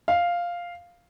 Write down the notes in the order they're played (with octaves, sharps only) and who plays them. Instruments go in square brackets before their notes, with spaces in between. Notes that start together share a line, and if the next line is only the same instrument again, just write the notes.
[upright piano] F5